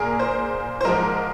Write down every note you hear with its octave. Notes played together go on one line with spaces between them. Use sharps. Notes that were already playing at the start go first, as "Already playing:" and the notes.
Already playing: A#2 A#3 G#4 A#4
C5
C5
G#2 F3 G#3 A#4